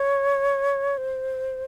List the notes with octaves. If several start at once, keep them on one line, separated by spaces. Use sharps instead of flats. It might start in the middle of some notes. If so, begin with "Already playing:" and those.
Already playing: C#5
C5